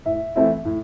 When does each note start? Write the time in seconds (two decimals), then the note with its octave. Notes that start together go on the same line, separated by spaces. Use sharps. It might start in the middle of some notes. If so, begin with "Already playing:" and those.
0.06 A2 E5
0.36 E3 A3 C4 E4
0.65 A2